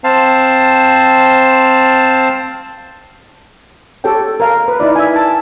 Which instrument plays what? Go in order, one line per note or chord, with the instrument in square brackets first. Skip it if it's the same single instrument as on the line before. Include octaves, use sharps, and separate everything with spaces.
[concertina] C4 C5 F5 A5
[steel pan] G4 A4 C#5 G5
A#4 F5
B4
D#4 E4 D5
E5 G#5
A5